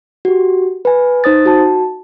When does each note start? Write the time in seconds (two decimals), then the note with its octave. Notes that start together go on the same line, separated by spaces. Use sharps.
0.25 F#4 G4
0.85 B4 G#5
1.24 D#4 C5 D#6 A6
1.46 F#4 A5